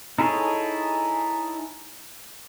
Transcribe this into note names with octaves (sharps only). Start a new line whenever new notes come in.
D#4 E4 G#4 A4 C#5